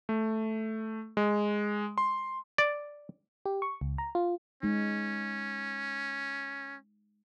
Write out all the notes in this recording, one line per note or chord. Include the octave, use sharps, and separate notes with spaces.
A3
G#3
C6
D5
G4
C#6
C#2
A#5
F4
G#3 C#4 D#4